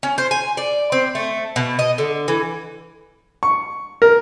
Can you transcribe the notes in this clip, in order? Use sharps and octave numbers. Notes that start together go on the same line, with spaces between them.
C#4
C5
G#5
D5
C4
A3
B2
D#5
D3
E3
C#6
A#4